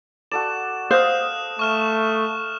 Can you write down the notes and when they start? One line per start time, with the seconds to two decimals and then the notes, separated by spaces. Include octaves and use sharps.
0.32 F#4 A4 D5 E7
0.91 C5 D#5 F5 D#6 F#6 E7
1.59 A3 C#6 F6 E7